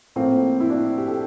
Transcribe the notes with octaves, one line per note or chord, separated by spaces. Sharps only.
A2 F3 A#3 C4
E4
D4
G4
A4